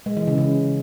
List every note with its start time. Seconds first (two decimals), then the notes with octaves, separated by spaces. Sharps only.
0.06 G#3
0.17 E3
0.27 C#3
0.38 C#3